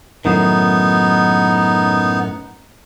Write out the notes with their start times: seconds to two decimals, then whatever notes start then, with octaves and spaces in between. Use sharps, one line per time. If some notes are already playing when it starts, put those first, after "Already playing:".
0.25 F#2 A2 D#3 B3 D#4